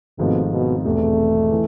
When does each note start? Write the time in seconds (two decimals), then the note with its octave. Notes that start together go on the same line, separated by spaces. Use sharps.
0.18 G#1 G#2 B2 F3 A3 C4
0.52 B2
0.85 E1 E2 C3 A3
1.51 E3